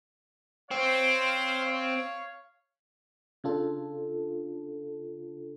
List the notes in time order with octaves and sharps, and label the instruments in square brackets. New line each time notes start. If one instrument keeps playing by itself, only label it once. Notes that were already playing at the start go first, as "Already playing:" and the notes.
[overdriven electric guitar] C4 [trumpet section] C5 C#5 F5
[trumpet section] C#5 F5
[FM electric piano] C#3 D4 F4 A4